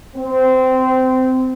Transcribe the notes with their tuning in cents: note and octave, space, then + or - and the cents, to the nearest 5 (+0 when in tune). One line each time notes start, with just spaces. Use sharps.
C4 -20